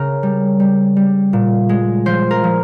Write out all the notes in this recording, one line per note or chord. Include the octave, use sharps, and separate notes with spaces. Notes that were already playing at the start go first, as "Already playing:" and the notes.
Already playing: C#3 A#4
G3
G3
G3
A#2
G#3
F3 C5
A#4
F3